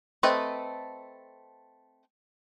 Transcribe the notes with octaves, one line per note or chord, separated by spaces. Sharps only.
A3 C4 A4 B4 D#5